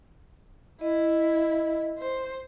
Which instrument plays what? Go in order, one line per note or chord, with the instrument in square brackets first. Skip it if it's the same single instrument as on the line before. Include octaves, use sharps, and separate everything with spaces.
[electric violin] E4 [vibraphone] D#5
[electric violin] C5